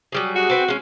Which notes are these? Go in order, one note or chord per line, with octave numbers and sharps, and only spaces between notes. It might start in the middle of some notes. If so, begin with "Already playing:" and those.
F#3 G3 G#4
F#4
C4 B4 G5
G#3 C#4